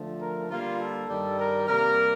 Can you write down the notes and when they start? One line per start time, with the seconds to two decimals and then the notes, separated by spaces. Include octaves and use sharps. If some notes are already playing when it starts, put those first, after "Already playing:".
Already playing: D3 F3 A3
0.20 A#4
0.49 D3 G3 A#3 F4
0.79 A4
1.08 G2 D#3 G3
1.38 A#4
1.68 C3 G3 A#3 A#4